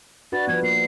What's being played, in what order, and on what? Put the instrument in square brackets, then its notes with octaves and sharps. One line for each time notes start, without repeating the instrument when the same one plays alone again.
[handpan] D4 F#4 B4 [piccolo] A6
[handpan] F3 G3 B3 [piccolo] G#6
[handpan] A#3 [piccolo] C7